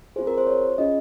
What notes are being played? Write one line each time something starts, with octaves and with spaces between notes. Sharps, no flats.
C4 F4 G#4 C5
A#4
C5
C#5
C#4 F4 G#4 D#5